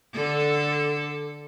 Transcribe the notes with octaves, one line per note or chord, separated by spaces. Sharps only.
D3 A4